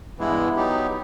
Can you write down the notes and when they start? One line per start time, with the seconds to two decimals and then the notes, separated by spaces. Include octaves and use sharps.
0.18 G2 E3 G#3 B3 E4
0.56 F#3 B3 D#4 G4